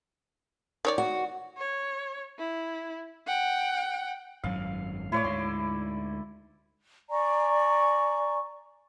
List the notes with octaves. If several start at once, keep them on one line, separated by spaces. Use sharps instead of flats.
D#3 C#5 D5
F#4
C#5
E4
F#5 G5
G#1 F#2 F#3 F5
A2 A3 E4 C#5 D5
D2 G#2 C6
D5 G#5 A#5 C#6